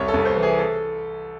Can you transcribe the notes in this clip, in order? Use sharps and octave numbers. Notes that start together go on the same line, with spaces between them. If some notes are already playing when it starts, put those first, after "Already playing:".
Already playing: C2 C#5
A4
C2
C5
E3
G#4
A4